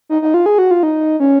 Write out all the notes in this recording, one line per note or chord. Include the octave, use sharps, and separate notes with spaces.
D#4
D#4
F4
G#4
F#4
F4
D#4
C#4